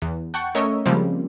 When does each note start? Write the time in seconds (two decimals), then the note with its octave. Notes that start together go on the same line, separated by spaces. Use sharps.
0.02 E2
0.34 F#5 G5 A5 C#6
0.55 A3 C#4 A#4 C#5 D#5 E5
0.86 C#3 F3 G3 G#3 A#3 C4